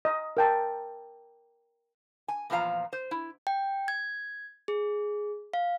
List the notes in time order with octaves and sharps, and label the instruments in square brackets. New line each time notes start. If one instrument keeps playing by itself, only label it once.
[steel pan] D#5
A#4 G5 A5
[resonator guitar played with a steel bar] G#5
E2 A#2 F3 B3 F5 A#5
C5
E4
[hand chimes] G5
G#6
G#4
F5